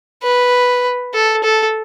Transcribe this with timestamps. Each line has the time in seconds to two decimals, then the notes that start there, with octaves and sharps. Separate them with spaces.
0.23 B4
1.14 A4
1.43 A4